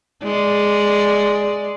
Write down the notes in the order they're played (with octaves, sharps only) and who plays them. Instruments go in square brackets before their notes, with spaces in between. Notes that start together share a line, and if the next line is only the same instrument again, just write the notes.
[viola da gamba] G#3 D5